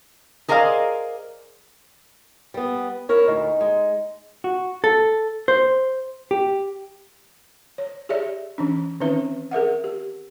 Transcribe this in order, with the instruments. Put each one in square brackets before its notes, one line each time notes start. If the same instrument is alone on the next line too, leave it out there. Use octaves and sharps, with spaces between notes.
[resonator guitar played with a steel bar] G#4 A#4 C5 D5 D#5 F5
[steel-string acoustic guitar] G3 B3
E4 A#4 C#5
[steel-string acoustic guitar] D2 [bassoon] D#4
[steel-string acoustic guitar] G#3
[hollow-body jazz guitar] F#4
A4
C5
G4
[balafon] C#5
G4 G#4 C#5 D5 E5
E3 C#4 D4
D#3 C4 C#4 D#4 B4 E5
G#4 A#4 E5 F#5
G4